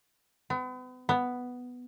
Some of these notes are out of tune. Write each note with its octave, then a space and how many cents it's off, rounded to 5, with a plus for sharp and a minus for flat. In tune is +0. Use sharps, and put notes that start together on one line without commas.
B3 +40
B3 +5